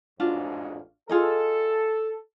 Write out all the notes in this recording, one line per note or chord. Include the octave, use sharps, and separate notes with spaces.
A1 F2 G#2 D4 F4 F#4
F4 G#4 A4 D#5